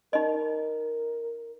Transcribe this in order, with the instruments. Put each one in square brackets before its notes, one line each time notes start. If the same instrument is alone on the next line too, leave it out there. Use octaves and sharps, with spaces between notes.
[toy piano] D#4 D#5 [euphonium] A#4